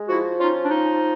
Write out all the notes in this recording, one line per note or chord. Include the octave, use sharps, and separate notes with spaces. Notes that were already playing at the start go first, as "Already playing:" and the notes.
Already playing: G#3
F3 E4 F#4
C#4 D#4 F4
D4
F3 D#4